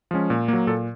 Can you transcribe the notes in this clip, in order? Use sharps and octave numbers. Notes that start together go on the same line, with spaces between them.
F3 G#3 C#4
A#2
F#3 A#3
A#2 A4